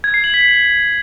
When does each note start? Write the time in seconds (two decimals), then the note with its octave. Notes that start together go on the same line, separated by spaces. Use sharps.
0.04 G#6
0.14 C7
0.24 F#7
0.34 B6